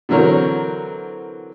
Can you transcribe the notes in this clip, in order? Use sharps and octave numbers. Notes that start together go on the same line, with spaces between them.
D3 E3 F#3 C4 A#4 C#5